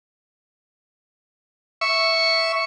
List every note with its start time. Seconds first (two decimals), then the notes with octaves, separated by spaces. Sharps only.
1.81 E5 C#6